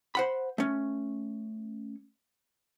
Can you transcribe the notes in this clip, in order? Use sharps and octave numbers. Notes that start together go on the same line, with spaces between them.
C5 F#5 B5
A3 C#4